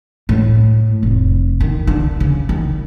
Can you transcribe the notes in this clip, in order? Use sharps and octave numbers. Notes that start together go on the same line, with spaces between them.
A2
F1
D#3
D3
C#3
D#3